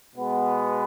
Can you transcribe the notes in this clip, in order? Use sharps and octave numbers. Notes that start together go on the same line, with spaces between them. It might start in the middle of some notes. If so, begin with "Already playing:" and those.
B2 G#3 B3